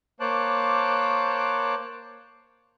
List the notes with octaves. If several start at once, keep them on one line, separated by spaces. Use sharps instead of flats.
A#3 C5 C#5 A5 D6 F#6